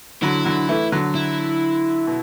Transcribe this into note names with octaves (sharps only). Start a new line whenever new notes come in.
D3 F#3 E4
D3 F#3
E3 A3
D3 F#3
E4
B2